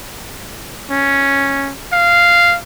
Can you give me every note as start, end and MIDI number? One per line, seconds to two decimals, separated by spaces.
0.90 1.72 61
1.92 2.56 77